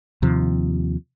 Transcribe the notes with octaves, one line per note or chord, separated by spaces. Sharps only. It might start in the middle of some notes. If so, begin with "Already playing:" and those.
D#2 C3 F3